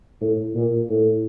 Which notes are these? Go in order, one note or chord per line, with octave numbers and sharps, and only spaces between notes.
A2
A#2
A2